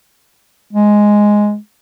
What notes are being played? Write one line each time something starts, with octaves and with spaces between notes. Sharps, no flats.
G#3